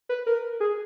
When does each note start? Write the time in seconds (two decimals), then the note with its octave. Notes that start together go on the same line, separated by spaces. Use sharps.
0.09 B4
0.27 A#4
0.60 G#4